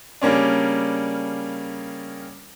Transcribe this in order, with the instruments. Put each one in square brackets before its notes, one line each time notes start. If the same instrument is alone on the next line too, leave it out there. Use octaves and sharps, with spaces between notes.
[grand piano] C#3 G3 A#3 C#4 D4